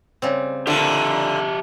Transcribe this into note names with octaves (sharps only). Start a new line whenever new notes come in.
C#3 G3 C4
A#2 D3 G4 E5 A5